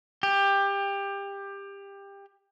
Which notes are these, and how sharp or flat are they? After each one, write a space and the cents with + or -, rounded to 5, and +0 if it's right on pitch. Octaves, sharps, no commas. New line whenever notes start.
G4 +20